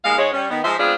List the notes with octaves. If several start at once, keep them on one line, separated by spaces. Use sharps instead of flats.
D#2 G#3 B3 F5
G#2 G#3 C#5
G3 C#4
D#3 B3
F3 G#3 D#4 C5 E5
G#3 B3 C4 D4 F4 G#4